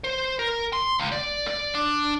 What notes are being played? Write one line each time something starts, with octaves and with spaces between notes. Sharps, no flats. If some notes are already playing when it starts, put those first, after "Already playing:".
C5
A#4
C6
C#2
D5
D5
D4